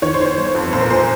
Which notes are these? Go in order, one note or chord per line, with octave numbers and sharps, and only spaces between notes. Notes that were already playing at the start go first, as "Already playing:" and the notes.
D#3 C#5
C5
D#3
C#5
G1
F2
A#1 C5
A#4
A#2 C5